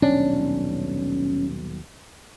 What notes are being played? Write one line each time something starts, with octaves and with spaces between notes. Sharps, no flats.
D#1 B1 C#4 D4